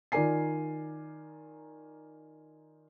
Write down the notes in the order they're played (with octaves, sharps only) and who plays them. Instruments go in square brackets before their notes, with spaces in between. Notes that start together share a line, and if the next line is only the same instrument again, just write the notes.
[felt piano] D#3 F4 A#4 D5 G#5 C7